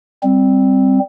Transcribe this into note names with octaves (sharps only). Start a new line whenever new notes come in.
G3 C4